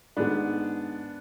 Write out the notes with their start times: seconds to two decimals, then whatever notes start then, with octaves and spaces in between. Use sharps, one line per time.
0.17 G#2 D#3 G#3 B3 D4